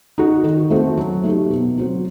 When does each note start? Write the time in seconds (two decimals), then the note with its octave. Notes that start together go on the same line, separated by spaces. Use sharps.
0.18 D#4 F#4
0.44 D#3
0.70 A3 C4 F#4
0.97 F#3
1.24 A3 D#4 G4
1.50 B2
1.78 F#3 C4 F#4